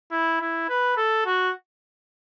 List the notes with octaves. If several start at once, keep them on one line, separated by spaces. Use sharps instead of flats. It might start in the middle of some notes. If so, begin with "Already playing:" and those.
E4
E4
B4
A4
F#4